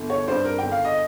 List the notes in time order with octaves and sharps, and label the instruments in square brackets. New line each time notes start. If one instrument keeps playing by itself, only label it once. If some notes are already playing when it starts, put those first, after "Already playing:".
Already playing: [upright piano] G1
C#5
G2 G3 C4 C5
A#4
G1 G5
F5
D#5